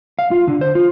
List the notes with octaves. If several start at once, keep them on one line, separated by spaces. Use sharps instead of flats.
F5
F4
D3
C5
F4